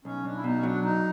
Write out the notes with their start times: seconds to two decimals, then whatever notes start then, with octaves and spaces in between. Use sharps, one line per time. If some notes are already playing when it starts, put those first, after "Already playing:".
0.05 B1 C#4
0.25 B1 D4
0.36 E4
0.44 B2 D#4
0.55 C#4
0.63 F#3 D4
0.83 B1 D#4